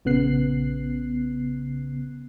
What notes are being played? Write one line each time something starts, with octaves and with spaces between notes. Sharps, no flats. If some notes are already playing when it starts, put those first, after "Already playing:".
A#1 C#3 B3 F#6 C7